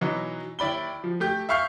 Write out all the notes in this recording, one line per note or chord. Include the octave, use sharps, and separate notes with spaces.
B2 E3 F#3 D#4
D#2 E4 D5 B5 G7
F3
A3 G4 G6
E5 F5 C#6 F6 G6 C7